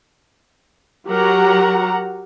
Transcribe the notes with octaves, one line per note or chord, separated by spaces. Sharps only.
F#3 F#4 G4 A#4 F#5 A#5